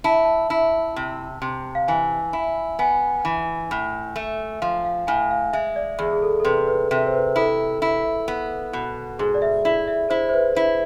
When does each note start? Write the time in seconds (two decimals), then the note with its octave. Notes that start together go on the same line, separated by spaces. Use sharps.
0.04 E4 A5
0.25 A5
0.50 E4
0.96 C3
1.42 C3
1.75 F5
1.88 E3 G#5
2.33 E4
2.79 B3 G#5
3.25 E3
3.71 A2
4.16 A3
4.62 F3 F5
4.84 F5
5.07 A2 G#5
5.31 F5
5.53 G#3 E5
5.76 D5
5.99 E2 G#4
6.13 G#4
6.22 A4
6.40 A4
6.44 C3 B4
6.68 B4
6.91 C3 E5
7.07 C5
7.14 B4
7.36 E4 A4
7.82 E4
8.28 B3
8.73 B2
9.19 G#2 G#4
9.34 D5
9.42 E5
9.65 E4
9.88 E5
10.10 E4 C5
10.29 C5
10.34 B4
10.56 E4